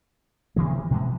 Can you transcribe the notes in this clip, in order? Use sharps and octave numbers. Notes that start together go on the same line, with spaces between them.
C3 D#3 E3 G#3
B2 E3 G#3